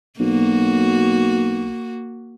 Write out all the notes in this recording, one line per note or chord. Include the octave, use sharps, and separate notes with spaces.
B1 A#3 F#4